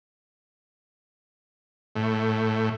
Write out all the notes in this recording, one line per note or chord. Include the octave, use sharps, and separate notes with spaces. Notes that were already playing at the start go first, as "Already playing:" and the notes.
A2